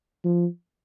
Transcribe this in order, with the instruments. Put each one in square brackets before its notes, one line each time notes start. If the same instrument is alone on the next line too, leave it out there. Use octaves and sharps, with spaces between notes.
[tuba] F3